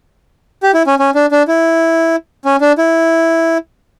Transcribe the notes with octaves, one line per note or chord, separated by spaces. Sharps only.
G4
E4
C#4
C#4
D4
D4
E4
C#4
D4
E4